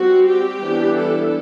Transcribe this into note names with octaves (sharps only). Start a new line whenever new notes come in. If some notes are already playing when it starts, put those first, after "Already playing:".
Already playing: G3 C4 F#4
G4
E3 G3 B3 D4
A4